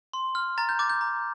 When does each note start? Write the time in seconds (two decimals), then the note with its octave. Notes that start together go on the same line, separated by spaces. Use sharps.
0.13 C6
0.35 F6
0.58 A#5 A6
0.69 G6
0.79 D6 G6 A6
0.90 G6
1.01 A#5